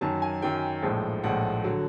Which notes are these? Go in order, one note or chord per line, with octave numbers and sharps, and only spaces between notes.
F#2 D#3 F#3 A5
G#5
F#2 D#3 F#3 G5
A#1 A2 F3 G#3
A#1 A2 F3 G#3 F#5
D3 F#3